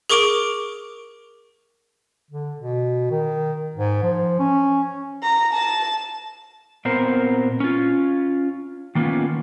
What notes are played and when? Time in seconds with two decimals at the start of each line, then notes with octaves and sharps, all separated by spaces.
0.10 G#4 A#4 C#6 D6 D7 F7
2.31 D3
2.57 B2
3.11 D#3
3.75 G#2
4.03 F3
4.39 C#4
5.23 A#5
5.53 A5
6.85 A#2 B3 C4 A#4 C5
7.60 C#4 F4
8.95 D#3 A#3 B3 C#4 F4